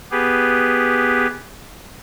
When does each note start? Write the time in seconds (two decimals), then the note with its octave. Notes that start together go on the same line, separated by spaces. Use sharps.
0.11 B3 G4 G#4 B4